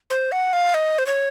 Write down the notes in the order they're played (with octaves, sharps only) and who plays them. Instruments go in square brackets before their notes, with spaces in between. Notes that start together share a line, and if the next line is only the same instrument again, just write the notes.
[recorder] C5
F#5
F5
D#5
C5
C#5